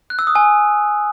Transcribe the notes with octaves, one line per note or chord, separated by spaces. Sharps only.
F#6
E6
D#6
G#5